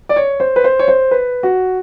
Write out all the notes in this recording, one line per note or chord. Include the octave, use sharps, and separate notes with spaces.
D5
C#5
C5
B4
C5
C#5
C5
B4
F#4